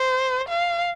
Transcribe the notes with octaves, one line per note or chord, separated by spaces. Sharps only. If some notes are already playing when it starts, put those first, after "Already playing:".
Already playing: C5
F5